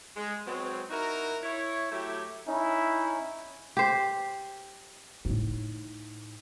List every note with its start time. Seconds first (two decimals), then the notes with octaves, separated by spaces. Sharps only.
0.16 G#3
0.46 F#3 G#3 B3 C4
0.90 D#4 E4 F#4 A#4
1.43 E4 C#5
1.92 F#3 A3 E4 G4
2.47 C#4 D#4 E4
3.77 G4 C5
5.25 A2 D#4